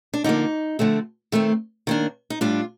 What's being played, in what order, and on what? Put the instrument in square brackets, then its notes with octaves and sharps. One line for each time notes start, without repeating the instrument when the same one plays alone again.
[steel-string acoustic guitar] D4
D3 F3 A#3 D#4
D3 F3 A3 C4
D#3 A3 C4
D#3 A#3 D4
D#4
A2 G3 D4 F4